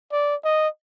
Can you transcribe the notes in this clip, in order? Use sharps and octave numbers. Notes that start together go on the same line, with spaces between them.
D5
D#5